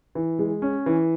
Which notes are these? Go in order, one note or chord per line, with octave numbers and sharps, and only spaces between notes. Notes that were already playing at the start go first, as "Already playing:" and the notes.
E3
G#3
C#4
E3